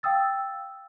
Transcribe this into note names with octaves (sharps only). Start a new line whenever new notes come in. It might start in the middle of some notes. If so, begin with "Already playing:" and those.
F5 G5 D#6 E6 A6